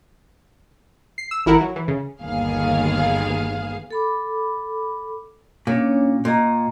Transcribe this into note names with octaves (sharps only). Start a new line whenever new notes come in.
C7
E6
A1 E4 A#4 F#5
F#3
E3
C#3
G1 D#2 B3 G#4 F5
A4 B5 D6
A#2 C#4 D4 C#5
A#2 D#5 A#5